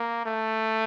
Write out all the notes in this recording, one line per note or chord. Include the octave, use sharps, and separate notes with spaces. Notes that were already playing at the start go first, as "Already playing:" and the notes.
Already playing: A#3
A3